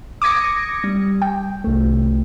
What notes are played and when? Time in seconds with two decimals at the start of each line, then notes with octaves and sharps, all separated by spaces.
0.22 D6 D#6 G#6 A#6 C#7
0.84 G3
1.22 G5
1.64 C2 A3